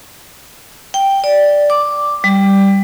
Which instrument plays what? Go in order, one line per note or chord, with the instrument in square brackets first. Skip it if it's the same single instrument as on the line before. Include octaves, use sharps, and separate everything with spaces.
[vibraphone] G5
D5
D6
G3